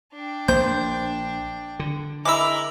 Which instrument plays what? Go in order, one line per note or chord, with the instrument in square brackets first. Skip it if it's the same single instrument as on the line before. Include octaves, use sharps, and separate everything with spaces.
[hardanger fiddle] D4 G5
[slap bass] A#1 A#3 [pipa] C5 [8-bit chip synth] G6
[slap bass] D3
[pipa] G#3 E4 [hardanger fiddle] A#4 B5 [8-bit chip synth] D6 E6